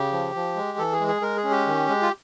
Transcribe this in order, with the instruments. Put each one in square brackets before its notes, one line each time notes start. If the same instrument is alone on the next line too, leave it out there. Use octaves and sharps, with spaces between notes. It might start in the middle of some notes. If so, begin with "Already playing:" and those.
Already playing: [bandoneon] C#3 G4
F3
F3
G#3
E3 A4
G#4
G#3
G#4
G#3 A#4
G#4
C#4
G4
D#3
G#3
F4